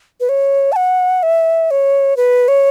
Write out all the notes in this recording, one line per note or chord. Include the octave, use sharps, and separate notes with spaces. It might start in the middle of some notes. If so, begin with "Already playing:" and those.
B4
C#5
A5
F#5
E5
C#5
B4
C#5